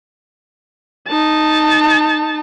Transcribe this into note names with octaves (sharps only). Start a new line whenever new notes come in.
D#4 A5